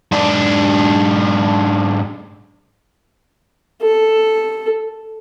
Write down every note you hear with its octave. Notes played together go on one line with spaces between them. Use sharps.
G#2 D4
A4